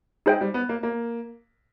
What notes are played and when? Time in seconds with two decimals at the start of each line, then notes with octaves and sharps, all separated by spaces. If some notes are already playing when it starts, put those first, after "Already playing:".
0.26 G#3 D#4 G#4 C5 E5 G5
0.41 G3
0.54 B3
0.69 A#3
0.83 A#3